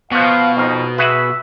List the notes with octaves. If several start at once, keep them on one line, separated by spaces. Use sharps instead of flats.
B2 F3 F#4 F5
F2 D#4 F5
F#4 G#4 B4 E5